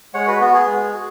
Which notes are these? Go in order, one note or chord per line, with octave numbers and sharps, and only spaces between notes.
G#3 C#5 F#5
F#4 B4
B3 F#4
G#4
G#3
F#4